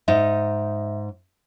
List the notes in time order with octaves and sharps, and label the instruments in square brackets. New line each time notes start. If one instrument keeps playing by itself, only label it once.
[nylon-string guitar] G#2 D#4 [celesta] E5